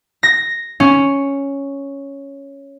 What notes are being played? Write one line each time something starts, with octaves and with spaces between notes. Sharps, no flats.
A#6
C#4